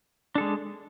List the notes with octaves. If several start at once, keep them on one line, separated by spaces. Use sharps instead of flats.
G#3 D4 A4